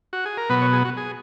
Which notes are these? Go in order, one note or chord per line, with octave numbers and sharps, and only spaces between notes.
F#4
G#4
A#4
B2 F#3 B3 B4
C#5
G#4
F#4
G#4